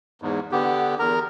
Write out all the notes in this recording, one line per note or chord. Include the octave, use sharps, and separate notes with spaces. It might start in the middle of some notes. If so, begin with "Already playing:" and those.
E2 G#2
D3 B3 G4
E2 A#4 A#5